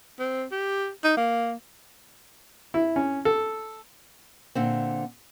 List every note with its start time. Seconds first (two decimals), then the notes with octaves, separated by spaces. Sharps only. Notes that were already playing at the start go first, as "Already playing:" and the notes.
0.20 C4
0.52 G4
1.04 D#4
1.17 A#3
2.74 E4
2.96 C#4
3.25 A4
4.55 A#2 D3 C4